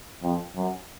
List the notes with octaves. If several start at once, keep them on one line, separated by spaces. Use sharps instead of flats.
F2
F#2